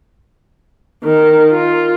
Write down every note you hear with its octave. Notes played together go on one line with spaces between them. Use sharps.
D#3
F4